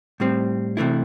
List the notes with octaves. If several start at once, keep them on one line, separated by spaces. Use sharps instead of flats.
A2 G3 C4
C3 E3 A3 E4